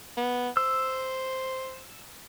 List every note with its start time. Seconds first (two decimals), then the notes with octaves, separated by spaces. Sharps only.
0.17 B3
0.57 C5 E6